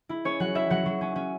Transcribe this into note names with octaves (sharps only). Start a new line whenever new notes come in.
E4
C#4 C#5
F#3 F#5
E4 E5
F#3 F#5
F#3
C#4
C#4